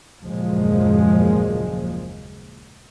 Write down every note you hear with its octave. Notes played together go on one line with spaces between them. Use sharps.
F#1 D#2 A#2 F3 G#3